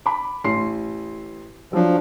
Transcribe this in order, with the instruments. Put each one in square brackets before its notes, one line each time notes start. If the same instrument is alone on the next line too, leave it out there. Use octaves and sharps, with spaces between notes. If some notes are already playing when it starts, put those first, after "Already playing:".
[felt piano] B5 D6
A1 C6 C7
[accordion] F3 [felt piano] F#3 D4